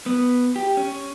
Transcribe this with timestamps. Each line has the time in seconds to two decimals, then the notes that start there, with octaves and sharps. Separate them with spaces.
0.06 B3
0.56 G4
0.77 C#4